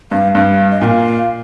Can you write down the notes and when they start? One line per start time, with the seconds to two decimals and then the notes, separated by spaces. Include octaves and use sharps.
0.11 G2 F5
0.35 G2 F5
0.71 D#5
0.81 A#2 F5 G#5